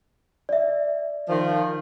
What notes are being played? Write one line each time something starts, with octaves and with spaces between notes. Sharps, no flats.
D5 E5
D#3 F3